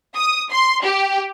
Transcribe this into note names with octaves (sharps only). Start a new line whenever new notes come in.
D#6
C6
G4